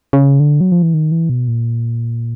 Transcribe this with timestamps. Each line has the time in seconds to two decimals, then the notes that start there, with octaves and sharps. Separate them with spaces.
0.13 C#3
0.40 D3
0.61 F#3
0.72 F3
0.82 E3
0.94 D#3
1.12 E3
1.29 B2
1.48 A#2